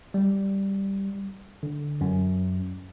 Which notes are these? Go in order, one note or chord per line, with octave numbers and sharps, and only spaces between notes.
G3
D3
F#2